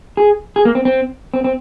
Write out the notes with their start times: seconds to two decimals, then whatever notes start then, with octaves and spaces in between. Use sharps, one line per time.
0.17 G#4
0.56 G#4
0.65 A#3
0.75 C4
0.85 C4
1.34 C4
1.44 C4